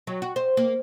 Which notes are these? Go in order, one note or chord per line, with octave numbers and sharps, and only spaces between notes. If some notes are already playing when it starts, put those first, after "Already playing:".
F#3
F#4
C5
A#3